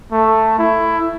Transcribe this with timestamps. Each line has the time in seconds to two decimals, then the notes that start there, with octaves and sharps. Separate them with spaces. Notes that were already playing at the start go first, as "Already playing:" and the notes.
0.12 A3
0.59 E4